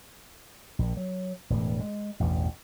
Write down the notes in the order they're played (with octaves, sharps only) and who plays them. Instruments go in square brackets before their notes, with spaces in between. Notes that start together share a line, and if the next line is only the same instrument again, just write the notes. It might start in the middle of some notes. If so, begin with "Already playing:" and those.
[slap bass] A#1
F#3
E1 A2 E3
G#3
A1 E2 G2 B2